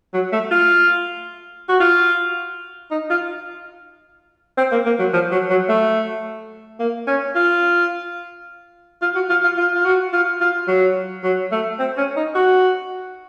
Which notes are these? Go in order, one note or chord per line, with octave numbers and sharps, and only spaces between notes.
F#3
A3
F4
F#4
F4
D#4
F4
C4
A#3
A#3
F#3
F3
F#3
F#3
A3
A#3
C#4
F4
F4
F#4
F4
F4
F4
F4
F#4
F4
F4
F#3
F#3
A3
C4
C#4
D#4
F#4